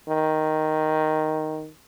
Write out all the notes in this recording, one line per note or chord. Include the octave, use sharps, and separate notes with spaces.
D#3